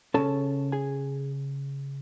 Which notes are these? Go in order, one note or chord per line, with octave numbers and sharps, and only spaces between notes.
C#3 G#3 C#4 A4 A5
G#4 G#5